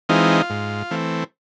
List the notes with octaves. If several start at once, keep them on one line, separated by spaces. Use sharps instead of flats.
E3 G#3 C4 D#4 F4
G#2
E3 A3 C4